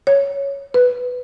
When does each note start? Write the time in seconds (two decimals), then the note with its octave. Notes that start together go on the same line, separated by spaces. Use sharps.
0.07 C#5
0.74 B4